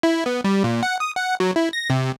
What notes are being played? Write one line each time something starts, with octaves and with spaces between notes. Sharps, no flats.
E4
B3
G3
A#2
F#5
D#6
F#5
F#3
E4
A#6
C3